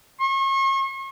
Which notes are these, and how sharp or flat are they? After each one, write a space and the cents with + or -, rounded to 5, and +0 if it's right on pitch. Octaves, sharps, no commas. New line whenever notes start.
C#6 -40